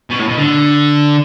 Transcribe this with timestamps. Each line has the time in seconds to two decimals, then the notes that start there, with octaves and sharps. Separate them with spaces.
0.10 B2
0.19 A2
0.29 B2
0.38 D3